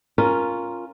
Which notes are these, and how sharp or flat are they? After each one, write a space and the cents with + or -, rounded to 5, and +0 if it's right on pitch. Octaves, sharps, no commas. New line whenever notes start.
C#4 +0 F4 +0 A#4 +0